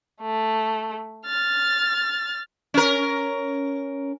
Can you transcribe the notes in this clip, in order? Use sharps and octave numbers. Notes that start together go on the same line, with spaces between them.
A3
F6 A6
C#4 A#4